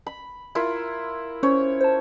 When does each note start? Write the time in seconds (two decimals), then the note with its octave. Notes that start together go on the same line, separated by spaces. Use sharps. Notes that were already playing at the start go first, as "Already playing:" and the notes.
0.06 B5
0.55 E4 F4 A#4
1.43 C#4 C5 C#5
1.81 C5 A5